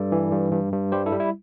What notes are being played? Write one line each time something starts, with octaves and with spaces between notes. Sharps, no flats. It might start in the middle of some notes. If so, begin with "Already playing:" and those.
Already playing: G2 A4 D5
E3
G2
G2
G2
G3 G4 C5
E4 A4
G3
E4